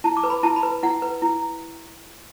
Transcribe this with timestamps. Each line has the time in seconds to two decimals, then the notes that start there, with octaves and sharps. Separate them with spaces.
0.04 E4 A5
0.17 D6
0.24 B4
0.30 B5
0.43 E4 A5
0.56 B5
0.63 B4
0.83 E4 F#5
1.02 B4
1.22 E4